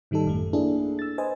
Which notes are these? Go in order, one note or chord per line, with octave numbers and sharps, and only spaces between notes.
G#2 D#3 G3 D#4 A4
A1 F#2 A3
A#3 D4 E4 G#4 A4
E6 A6
B4 C5 D#5 G#5